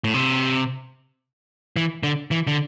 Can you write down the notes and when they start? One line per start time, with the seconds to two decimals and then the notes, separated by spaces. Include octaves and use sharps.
0.04 A2
0.14 C3
1.76 E3
2.03 D3
2.31 E3
2.47 D3